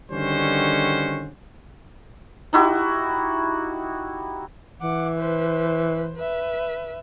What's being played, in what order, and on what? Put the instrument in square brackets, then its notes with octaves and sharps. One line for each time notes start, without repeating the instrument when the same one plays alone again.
[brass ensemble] D3 D#3 G3 C#4 F#4 C5
[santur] D#4 E4 F#4 G4
[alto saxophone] E3 [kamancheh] F#5 D6
[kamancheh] B4 C5
B4 E5